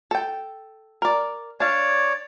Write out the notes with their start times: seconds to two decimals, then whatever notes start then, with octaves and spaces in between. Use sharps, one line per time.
0.11 A4 G5
1.02 A#4 D5
1.60 D4 C#5 D5 F5